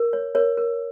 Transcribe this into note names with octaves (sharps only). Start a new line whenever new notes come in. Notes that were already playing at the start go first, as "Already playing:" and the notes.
Already playing: A#4
C#5
A#4 C#5
A#4